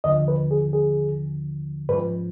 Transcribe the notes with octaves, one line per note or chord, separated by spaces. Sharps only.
D#2 D3 F3 D#5
B4
G#4
G#4
G#2 F3 B4